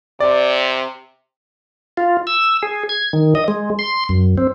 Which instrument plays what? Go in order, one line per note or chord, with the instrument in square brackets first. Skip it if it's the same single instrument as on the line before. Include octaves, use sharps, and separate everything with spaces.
[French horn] C3 [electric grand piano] D5
[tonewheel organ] F4
E6
G#4
G#6
D#3
D#5
G#3
C6
F#2
C4